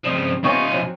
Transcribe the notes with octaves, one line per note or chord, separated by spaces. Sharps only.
C#3 F3 G3 C4 D#5
B1 B3 D#4 F4 G4 C#5 G#5
F3 F#3 C4